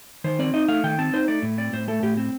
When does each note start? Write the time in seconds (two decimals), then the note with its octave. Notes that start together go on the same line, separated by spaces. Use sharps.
0.24 D#3 C5
0.39 C4 D5
0.54 D#4 D#5
0.68 A3 F5
0.83 D#3 G5
0.99 C4 A5
1.13 D#4 C5
1.28 A3 D5
1.43 A2
1.58 C4 D5
1.73 A2 C5
1.88 A3 A4
2.03 A2 G4
2.17 C4